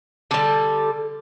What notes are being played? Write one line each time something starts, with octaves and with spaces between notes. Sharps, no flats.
D3 G3 A4